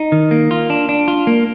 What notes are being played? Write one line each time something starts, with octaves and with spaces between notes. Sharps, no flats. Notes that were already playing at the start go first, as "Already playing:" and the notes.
Already playing: D#4
D#3
A#3
F4
D4
D4
F4
A#3